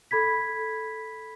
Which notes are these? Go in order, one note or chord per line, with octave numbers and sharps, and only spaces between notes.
A4 B5 G#6 B6